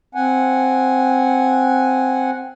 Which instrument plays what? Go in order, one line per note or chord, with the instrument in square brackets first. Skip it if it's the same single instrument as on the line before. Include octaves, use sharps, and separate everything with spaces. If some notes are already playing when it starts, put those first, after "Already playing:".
[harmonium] C4 F#5 G#5